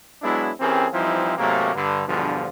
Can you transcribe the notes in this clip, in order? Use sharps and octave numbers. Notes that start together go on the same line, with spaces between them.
F#3 G#3 B3 D4 E4
E3 C4 C#4 G4 G#4 A#4
E3 F3 G3 C4 D#4 E4
G#2 C3 F#3 A3 A#3
G2 D3
E2 G2 B2 D3 F3